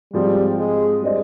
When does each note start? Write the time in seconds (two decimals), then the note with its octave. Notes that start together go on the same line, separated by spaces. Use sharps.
0.13 G#2 F3 G3 C4
0.58 G#3
1.02 G3 D4 G#4 C5 D#5